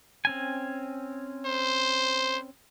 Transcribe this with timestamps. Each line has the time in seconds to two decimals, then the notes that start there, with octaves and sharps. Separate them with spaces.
0.25 C4 C#4 G#5
1.45 C5